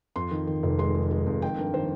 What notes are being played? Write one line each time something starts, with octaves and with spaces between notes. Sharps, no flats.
F2 C6
D#3
D#3
F1
G#3 C6
G#3
G#3
F2
D#3 G5
G2 A#4
D#3 C5